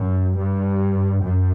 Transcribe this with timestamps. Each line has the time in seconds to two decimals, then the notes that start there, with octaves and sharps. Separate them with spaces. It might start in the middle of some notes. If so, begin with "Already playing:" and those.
Already playing: F#2
0.37 G2
1.23 F#2